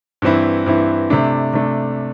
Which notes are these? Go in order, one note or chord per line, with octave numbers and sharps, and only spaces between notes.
G2 E3 C4 E4
G2 E3 C4 E4
C3 A3 D4
C3 A3 D4